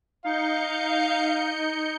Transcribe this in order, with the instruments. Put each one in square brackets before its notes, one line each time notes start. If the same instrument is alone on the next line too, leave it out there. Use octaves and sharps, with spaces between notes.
[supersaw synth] D#4 G6 C#7 [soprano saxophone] F5